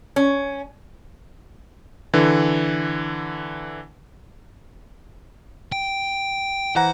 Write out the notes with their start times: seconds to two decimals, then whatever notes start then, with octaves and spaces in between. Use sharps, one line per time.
0.16 C#4
2.13 D3 E3
5.72 G5
6.76 E3 C5 F#5 A#5